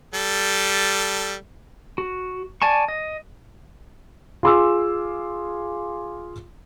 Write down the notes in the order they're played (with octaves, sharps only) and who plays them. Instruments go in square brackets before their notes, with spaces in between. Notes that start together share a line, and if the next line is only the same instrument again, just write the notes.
[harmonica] G3 A4
[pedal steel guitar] F#4
D5 G#5 A5 C#6
D#5
[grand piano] F4 G#4 C6 D6 E6